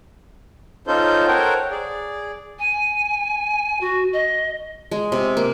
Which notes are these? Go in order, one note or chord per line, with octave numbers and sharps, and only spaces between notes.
C#4 D#4 F4 A4 C5 G6
A4 A#4 C5 C#5 F#5 G5
G#4 D5
G#5
F#4
D#5
G#3
C3
A#3